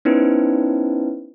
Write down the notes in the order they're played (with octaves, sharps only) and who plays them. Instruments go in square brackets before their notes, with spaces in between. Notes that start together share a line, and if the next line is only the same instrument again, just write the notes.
[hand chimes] B3 C#4 D#4 E4 B4 C5